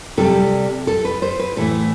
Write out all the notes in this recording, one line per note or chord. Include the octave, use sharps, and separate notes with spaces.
C3 G3 A4
A4
B4
C5
B4
A2 E3 A3 A4